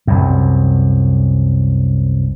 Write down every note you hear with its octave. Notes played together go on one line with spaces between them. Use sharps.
C2 F#2